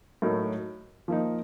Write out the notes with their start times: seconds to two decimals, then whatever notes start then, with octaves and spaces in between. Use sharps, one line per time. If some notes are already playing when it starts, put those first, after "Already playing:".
0.22 A2 F#3 A3 D#4 A#4
1.08 F3 A#3 D#4